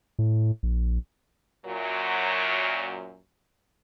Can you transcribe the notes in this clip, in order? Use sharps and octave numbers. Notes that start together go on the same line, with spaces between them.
A2
A#1
F#2 A#2 F#3